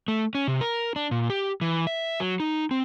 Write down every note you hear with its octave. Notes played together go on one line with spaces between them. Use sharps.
A3
C#4
C3
A#4
D4
A#2
G4
E3
E5
F#3
D#4
C4